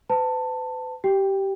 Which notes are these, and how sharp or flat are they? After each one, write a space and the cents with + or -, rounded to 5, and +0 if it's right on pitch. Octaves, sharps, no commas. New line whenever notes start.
B4 +40 A5 +15
G4 -15 G5 +10